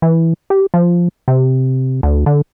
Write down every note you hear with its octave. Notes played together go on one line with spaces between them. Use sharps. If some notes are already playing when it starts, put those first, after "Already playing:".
E3
G4
F3
C3
D2
D3